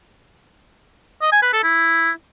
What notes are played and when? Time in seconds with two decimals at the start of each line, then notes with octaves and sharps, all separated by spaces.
1.22 D#5
1.32 G#5
1.42 B4
1.53 A4
1.63 E4